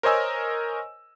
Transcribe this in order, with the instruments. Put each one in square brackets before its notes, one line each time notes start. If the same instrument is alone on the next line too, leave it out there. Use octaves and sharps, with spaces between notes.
[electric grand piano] A#4 C5 C#5 D#5 G#5 E6